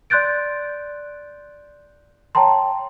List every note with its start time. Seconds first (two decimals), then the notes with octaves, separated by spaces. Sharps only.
0.10 D5 C6 F#6 G6 A6 D7
2.35 C#5 G5 A5 A#5 C6